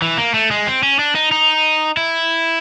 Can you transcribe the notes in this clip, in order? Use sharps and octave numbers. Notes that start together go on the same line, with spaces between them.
E3
A#3
A3
G#3
C4
C#4
D4
D#4
D#4
E4